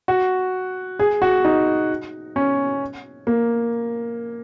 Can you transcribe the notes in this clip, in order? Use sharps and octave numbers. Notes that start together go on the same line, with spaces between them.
F#4
G#4
F#4
D#4
C#4
A#3